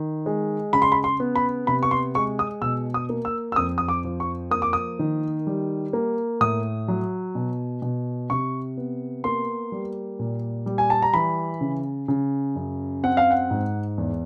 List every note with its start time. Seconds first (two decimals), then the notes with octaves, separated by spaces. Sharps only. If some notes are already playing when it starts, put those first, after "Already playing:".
Already playing: D#3
0.26 G#3
0.73 C#3 B5
0.82 C6
0.92 B5
1.04 C6
1.20 B3
1.36 B5
1.67 C3 B5
1.83 C#6
1.91 C6
2.15 G#3 C#6
2.39 D#6
2.62 B2 E6
2.94 D#6
3.09 A#3
3.25 E6
3.52 E6
3.56 F2 D#6
3.78 D#6
3.88 D6
4.05 F3
4.20 C#6
4.51 A#3 D#6
4.62 D6
4.73 D#6
4.99 D#3
5.47 G3
5.93 A#3
6.41 A2 D#6
6.88 F#3
7.35 B2
7.82 B2
8.30 C3 C#6
8.77 B3
9.24 A#3 C6
9.72 G3
10.19 A#2
10.66 G3
10.78 G#5
10.90 A5
11.02 A#5
11.14 E3 B5
11.61 C#3
12.08 C#3
12.56 F#2
13.03 C4 F#5
13.17 F5
13.30 F#5
13.51 G#2
13.98 E2